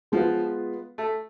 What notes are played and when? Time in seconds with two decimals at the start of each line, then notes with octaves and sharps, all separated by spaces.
0.12 F3 G#3 B3 F4 B4
0.98 A3